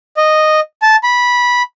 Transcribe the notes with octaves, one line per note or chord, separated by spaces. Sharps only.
D#5
A5
B5